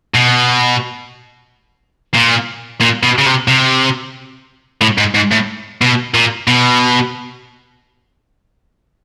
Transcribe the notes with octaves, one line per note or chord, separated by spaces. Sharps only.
B2
A#2
A#2
B2
C#3
C3
C3
A2
G#2
G#2
A2
B2
A#2
B2